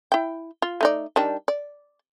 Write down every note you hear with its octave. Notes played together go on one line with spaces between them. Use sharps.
E4 G5
F4
A3 D#4 D5
D#3 G3 D4
D5